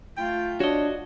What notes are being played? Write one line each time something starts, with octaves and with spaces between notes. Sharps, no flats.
A3 F4 G5
D4 F#4 C#5 D#5